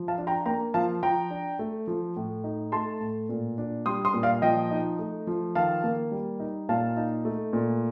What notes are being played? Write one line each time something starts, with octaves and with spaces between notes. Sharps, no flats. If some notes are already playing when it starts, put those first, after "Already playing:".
Already playing: F3
F5 A5
D4
G5 A#5
A#3 G5 A#5
F3 F5 A5
F3 G5 A#5
D4
A3
F3
A2
D#4
A3 A5 C6
A2
A#2
D4
G3 C6 D#6
C6 D#6
A#2
D5 F5
F3 D#5 G5
D#4
A3
F3
D#3 F5 A5
A#3
G3
D#4
A#2 F5 A5
D#4
A3
A#2